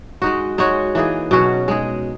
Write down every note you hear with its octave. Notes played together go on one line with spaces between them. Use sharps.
G#3 D#4 F#4
G#3 D#4 F#4 C#5
E3 A#3 D#4 G#4
B2 F#3 C#4 F#4
G#3 D#4 G#4